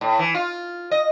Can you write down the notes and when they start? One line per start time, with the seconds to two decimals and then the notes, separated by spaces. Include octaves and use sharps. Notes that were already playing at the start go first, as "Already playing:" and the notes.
0.01 A2
0.19 E3
0.34 F4
0.91 D#5